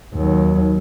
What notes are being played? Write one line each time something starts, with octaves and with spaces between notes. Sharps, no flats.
D#2 F#3